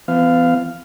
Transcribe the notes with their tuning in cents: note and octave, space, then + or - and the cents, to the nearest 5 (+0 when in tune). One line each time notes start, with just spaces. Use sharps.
E3 +40 B3 +40 F5 +0